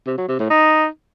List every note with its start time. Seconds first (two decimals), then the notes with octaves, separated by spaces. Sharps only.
0.07 C3
0.18 F#3
0.29 C3
0.39 A2
0.50 D#4